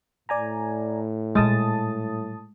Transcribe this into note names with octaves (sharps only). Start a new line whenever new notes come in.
A2 D5 G#5 A#5
A#2 G3 G#3 A5 D#6 A6